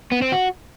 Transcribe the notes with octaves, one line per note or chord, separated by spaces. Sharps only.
B3
C4
F#4